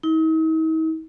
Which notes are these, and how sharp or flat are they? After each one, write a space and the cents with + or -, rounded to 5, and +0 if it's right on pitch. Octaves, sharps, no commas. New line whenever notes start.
D#4 +45